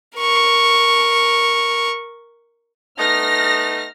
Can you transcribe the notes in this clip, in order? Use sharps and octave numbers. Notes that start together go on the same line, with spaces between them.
A#4 C#6
A3 B3 D#4 F6 A#6